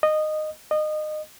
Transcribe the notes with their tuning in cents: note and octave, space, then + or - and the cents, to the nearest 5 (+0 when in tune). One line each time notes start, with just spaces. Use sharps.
D#5 -15
D#5 -25